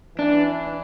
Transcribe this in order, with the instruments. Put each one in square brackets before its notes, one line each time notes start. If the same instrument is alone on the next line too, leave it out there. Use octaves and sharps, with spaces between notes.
[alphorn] E3 [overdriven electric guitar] D4